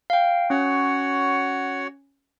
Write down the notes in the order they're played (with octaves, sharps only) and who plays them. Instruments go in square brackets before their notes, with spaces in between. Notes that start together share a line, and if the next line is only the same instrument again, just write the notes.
[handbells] F5 G5
[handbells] C#4 [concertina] F#4 C#5 F#5